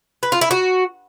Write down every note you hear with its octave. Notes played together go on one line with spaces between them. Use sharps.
B4
F4
E4
F#4